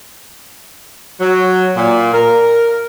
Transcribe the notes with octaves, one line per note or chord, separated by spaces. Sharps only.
F#3
A#2
A#4